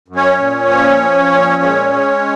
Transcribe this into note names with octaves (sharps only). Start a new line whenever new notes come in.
F#2
C#4 C#5
A#2
F3
F3
A#2
G#3
G#3